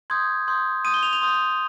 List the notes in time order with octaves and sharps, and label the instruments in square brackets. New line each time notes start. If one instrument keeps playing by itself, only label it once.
[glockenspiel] C6 D#6 G6 G#6
C6 D#6 G6
C6 D#6 G6 D#7
G7
F7
F7
C6 D#6 G6